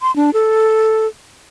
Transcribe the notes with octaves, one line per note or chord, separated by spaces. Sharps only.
C6
D4
A4